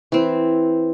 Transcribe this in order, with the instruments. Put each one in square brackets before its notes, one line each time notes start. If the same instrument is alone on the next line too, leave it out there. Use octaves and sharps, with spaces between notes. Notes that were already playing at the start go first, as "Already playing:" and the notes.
[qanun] E3 C4